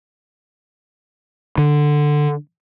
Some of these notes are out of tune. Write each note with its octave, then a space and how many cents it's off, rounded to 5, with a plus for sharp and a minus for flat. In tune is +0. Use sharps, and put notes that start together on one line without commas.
D3 +10